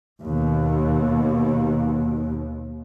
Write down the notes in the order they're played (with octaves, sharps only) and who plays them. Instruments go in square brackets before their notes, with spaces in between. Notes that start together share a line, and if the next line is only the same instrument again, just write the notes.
[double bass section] D#2 B2